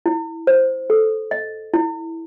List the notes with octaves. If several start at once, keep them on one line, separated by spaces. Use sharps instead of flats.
E4
C5
A4
D#5
E4